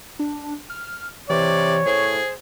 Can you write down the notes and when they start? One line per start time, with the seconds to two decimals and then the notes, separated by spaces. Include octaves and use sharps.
0.19 D4
0.70 F6
1.30 C3 E3 C#5 D5
1.86 A2 G#4 C5